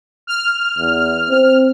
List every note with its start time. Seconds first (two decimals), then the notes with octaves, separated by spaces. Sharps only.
0.27 F6
0.78 E2
1.30 C4